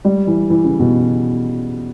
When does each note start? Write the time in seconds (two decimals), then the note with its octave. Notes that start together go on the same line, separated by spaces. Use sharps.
0.05 G3
0.27 E3
0.50 E3
0.64 C#3
0.79 B2